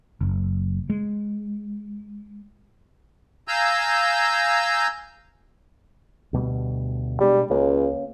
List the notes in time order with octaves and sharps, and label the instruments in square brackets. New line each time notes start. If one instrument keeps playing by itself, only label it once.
[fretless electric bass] F#1
G#3
[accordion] F5 G#5 A#5 E6 G6
[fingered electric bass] D2 B2 G3
[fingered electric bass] B2 G#3 D4 [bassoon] G3
[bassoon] C#2 [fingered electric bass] A#3 C#4